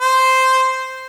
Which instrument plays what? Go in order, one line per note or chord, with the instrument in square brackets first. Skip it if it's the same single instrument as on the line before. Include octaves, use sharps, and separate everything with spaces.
[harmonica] C5